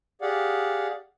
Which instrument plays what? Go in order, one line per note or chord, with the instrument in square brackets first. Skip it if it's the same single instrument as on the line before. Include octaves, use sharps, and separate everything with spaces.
[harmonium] G4 G#4 D5 F5 F#5